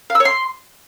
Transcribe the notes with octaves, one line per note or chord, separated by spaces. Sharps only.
F5
E6
C#5
C6